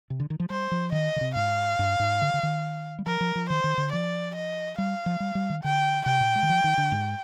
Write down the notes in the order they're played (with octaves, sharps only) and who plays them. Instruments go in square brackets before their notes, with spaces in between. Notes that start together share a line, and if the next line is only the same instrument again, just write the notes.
[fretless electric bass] C3
D3
D#3
F3
[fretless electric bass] G3 [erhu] C5
[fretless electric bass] F3
[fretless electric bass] D#3 [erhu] D#5
[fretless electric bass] D3
C3
[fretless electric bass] G#2 [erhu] F5
[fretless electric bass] G2
G#2
D3
D3
D#3
G3
[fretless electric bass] F3 [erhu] A#4
[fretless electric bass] F3
F3
[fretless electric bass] D#3 [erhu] C5
[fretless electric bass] D#3
D3
[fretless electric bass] F3 [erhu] D5
[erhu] D#5
[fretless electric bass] G3 [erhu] F5
[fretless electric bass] F3
G3
G3
D#3
[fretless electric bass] D3 [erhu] G5
[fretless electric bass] C3 [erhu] G5
[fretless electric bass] A#2
G#3
D#3
F3
D#3
D3
G#2